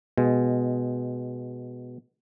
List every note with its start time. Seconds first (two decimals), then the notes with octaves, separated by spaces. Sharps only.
0.18 B2 G#3